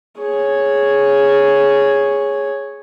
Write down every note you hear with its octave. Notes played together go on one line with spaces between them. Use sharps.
G#4 C#5